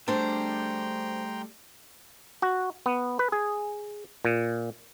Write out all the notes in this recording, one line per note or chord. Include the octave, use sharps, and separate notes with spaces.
G3 A3 D4 C5 G5 A#5 C6
F#4
B3
B4
G#4
A#2